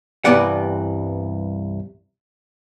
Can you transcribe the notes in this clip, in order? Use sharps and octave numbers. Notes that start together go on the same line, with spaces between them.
C2 G2 E3 B3 D5 F#5